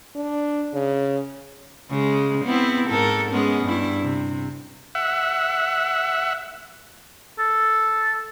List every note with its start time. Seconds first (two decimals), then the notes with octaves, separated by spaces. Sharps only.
0.16 D4
0.74 C#3
1.91 C#3 G#3
2.46 B3 C4 E4
2.90 G#2 A4 A#4
3.31 G#3 B3 C#4
3.65 G2 E4
4.02 C3
4.95 E5 F#5
7.39 A4